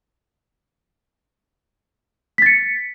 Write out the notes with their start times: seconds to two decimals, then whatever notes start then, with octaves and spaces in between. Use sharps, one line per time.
2.38 B6
2.42 A6
2.46 C#7